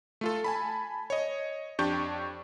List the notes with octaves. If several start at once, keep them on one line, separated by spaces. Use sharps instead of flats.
A3 F4 A4
G#5 A5 B5
C#5 D#5
F2 D4 G4 C#6 G6